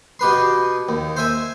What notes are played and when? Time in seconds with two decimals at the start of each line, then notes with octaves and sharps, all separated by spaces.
0.19 B2 G4 B4 C6
0.88 D#2
1.16 C5 E5 G#5